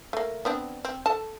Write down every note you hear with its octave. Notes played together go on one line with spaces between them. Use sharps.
A3 A#3
B3 C4 D4
C4
A4 A5